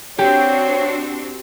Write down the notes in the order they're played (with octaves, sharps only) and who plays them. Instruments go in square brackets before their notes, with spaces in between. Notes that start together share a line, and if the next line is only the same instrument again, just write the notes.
[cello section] C4 D4 F#4 [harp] G4 [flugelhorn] C#5